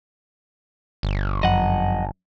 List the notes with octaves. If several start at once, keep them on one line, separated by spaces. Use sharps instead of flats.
G1
F#2 F3 D#5 F#5